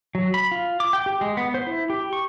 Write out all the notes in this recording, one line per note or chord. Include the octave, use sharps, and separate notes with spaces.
F#3
B5
F4
D6
G5
G4
G#3
B3
C5
E4
G4
C#6